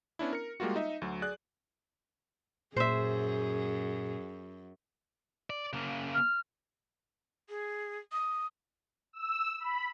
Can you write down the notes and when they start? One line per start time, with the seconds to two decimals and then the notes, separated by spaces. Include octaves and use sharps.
0.19 B3 C#4 D4 E4
0.33 A#4 C#7
0.60 G3 G#3 A#3 F4 F#4
0.76 D#4 D#5 E5
1.02 D2 F#3
1.22 G#4 D5 F#6
2.76 F#2 A#2 G#4 C5 E5
5.50 D5
5.73 C#3 A#3
6.14 F6
7.49 G#4
8.12 D#6
9.13 E6
9.60 B5